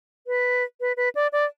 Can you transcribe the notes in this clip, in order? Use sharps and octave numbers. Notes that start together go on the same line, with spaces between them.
B4
B4
B4
D5
D5